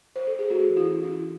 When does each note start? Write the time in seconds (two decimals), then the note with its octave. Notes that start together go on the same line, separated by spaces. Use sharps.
0.16 C5
0.27 A4
0.39 G#4
0.50 A3 F#4
0.69 E3
0.77 E4
0.89 C#4
1.03 E4
1.09 E3